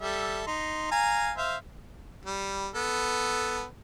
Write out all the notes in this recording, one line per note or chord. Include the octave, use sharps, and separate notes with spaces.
G3 A4 E5
D#4 C6
F5 G#5 A#5
C5 E5 F5
G3
B3 A4